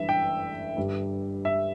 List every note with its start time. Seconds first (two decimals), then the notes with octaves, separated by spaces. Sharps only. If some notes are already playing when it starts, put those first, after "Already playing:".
Already playing: G1 G2 E3 E5
0.09 G5
0.77 G1 G2 G3
1.45 E5